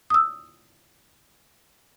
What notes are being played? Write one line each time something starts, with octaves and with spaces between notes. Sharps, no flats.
D#6 E6